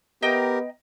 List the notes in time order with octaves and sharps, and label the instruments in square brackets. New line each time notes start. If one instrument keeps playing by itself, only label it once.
[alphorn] B3 [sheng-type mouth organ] G4 A#4 [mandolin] D#5 G5 A#5